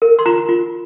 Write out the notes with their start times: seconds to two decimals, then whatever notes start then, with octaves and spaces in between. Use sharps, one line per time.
0.02 A#4
0.19 C6
0.26 F4 A#5
0.49 F4